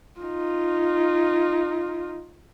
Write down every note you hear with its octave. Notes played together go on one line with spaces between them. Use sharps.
D#4 F4